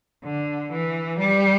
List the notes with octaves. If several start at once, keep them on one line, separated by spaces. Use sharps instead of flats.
D3
E3
G3